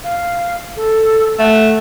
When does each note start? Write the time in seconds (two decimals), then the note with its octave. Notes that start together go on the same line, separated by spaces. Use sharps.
0.04 F5
0.76 A4
1.39 A3 F#5